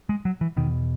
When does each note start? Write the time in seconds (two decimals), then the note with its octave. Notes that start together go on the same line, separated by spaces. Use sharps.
0.09 G#3
0.25 F#3
0.41 E3
0.57 E2 B2 D#3